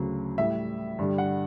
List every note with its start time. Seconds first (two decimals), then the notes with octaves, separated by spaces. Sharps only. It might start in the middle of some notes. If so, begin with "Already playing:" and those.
Already playing: D2 C#3 F#3
0.38 A2 G3 E5
0.99 G2 D3 G3
1.18 F#5